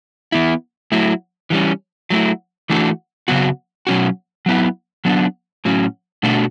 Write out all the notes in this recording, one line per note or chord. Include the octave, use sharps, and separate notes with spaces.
E3 B3 E4
F#3 A3 E4
E3 G3 C#4
F#3 A3 E4
E3 A3 D4 F#4
C#3 F#3 B3 F#4
B2 F#3 C#4 F#4
F#3 B3 E4
F#3 B3 D4
A2 F#3 C#4
B2 A3 D4 F#4